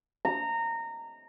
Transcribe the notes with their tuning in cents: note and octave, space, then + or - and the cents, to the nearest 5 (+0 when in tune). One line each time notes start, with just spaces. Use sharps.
A#5 -20